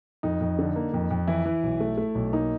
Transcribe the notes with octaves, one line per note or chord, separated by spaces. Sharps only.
F2 D#4
F2
D3
A#3
F2
F2
E3 E4
E3
B1
A3
A3
B1
A#3 D#4